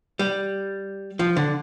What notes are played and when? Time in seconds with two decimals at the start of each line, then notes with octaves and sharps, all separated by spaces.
0.19 G3
1.19 F3
1.36 D3